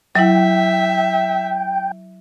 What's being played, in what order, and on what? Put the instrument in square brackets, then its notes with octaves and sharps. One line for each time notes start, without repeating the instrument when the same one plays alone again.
[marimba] F#3 E4 [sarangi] E5 [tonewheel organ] G5